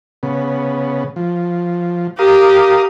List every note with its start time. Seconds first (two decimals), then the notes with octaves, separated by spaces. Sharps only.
0.23 C#3 B3
1.16 F3
2.19 G4 A#4 F5 D#6